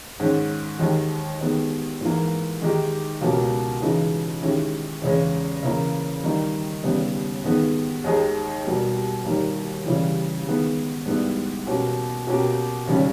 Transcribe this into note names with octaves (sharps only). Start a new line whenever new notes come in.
G#2 D#3 G#3 C#4
D#2 D#3 G#3 D#4
D#3 G#3 B3
G#2 E3 A#3
D#3 G#3 D#4 G4
C#2 B2 A#3 C#4 G4
C#3 E3 G#3 D#4
D#3 G#3 C#4 E4 G4
E2 C#3 G#3 C#4
C#3 E3 A#3
D#3 G3 A#3 D#4
D#2 C#3 G3 B3
G#2 D#3 G#3 B3
D#2 D#3 G#3 D#4 G#4
B2 G3 A#3
D#2 D#3 G3 A#3
C#3 E3 G3
D#3 G#3 B3
G#2 G3 B3 E4
B2 A#3 C#4 G4
B2 A#3 C#4 G4
D#2 C#3 G3 C#4